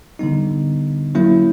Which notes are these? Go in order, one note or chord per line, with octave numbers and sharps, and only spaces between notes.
D3 G3 B3 D#4
F#3 A#3 C#4 E4